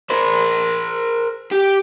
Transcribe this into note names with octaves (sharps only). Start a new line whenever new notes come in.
A#4 C5
G4